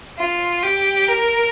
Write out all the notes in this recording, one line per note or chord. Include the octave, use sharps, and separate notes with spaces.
F4
G4
A#4